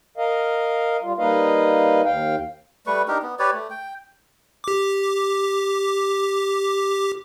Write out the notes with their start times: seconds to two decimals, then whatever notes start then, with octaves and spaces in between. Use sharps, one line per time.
0.17 A#4 D#5 F5
1.02 G3 F4
1.18 G3 A#3 D#4 B4 D#5 F5
2.04 D#2 F5 G5
2.86 G3 A3 B4 C#6
3.08 D4 D#4 G4 A#4
3.23 B3
3.39 G4 B4 C#5 D5
3.53 A3
3.70 G5
4.64 G4 D6